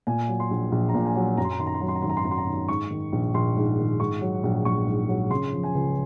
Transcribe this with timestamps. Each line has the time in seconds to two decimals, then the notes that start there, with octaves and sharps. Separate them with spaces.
0.07 A#2 G#5
0.28 F#3
0.40 C6
0.51 A#1
0.72 A#1
0.89 A#5
0.94 A#2
1.05 G#5
1.16 F#3
1.37 F#2 A#5
1.45 C6
1.52 A#5
1.60 D#3 C6
1.66 A#5
1.74 C6
1.81 F#3 A#5
1.88 C6
1.95 A#5
2.02 G#1 C6
2.10 A#5
2.17 C6
2.24 F#2 A#5
2.31 C6
2.38 A#5
2.47 D#3
2.68 G#2 C#6
2.91 D#3
3.12 A#1
3.34 A#1 C6
3.56 G#2
3.78 D#3
4.00 G#2 C#6
4.21 F#3
4.43 A#1
4.65 A#1 C#6
4.87 G#2
5.09 F#3
5.31 C#3 C6
5.53 F3
5.63 G#5
5.75 C#2